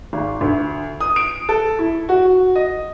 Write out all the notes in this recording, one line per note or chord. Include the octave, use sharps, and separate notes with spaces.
G#1
D2
D#6
D7
A4
E4
F#4
D#5